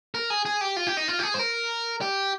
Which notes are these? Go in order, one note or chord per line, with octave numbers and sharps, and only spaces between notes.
A#4
G#4
G#4
G4
F4
G4
D#4
F4
G4
G#4
C5
A#4
G4